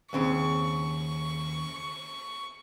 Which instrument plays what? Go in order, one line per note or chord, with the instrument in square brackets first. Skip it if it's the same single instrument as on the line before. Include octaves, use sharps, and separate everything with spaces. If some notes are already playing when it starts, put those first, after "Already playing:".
[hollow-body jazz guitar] D#2 C#3 C4 [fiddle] C#6